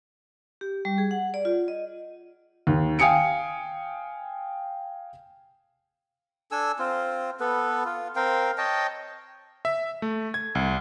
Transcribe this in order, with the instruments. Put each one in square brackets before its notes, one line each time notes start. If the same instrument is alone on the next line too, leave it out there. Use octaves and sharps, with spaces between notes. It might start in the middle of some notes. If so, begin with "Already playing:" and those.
[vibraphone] G4
G3
G#4
F#5
D5
F4
D#5
[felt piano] D#2
F5 G5 G#5 D#6 C#7 D7
[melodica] D4 A4 G#5 E6
C4 F4
B3 A4 B4
F4
C4 A#4 F5 G5
C#5 D#5 G5 A5
[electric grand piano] E5
A3
G#6
C2